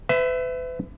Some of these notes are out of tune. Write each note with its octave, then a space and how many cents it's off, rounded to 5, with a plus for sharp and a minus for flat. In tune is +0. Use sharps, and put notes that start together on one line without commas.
B4 +40 E5 +0